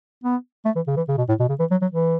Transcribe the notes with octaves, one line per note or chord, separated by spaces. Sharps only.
B3
A3
E3
C#3
E3
C#3
B2
A2
B2
C#3
E3
F#3
F#3
E3